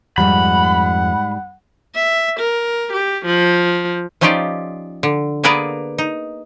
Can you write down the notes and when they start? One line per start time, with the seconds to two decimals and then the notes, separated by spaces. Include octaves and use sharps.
0.18 F2 G#2 G3 F#5 B5
1.95 E5
2.40 A#4
2.92 G4
3.25 F3
4.21 F3 C#4 D#4 F4 G4 D5
5.03 D3
5.44 A#3 B3 G#4 A#4 B4 D5
5.98 D#4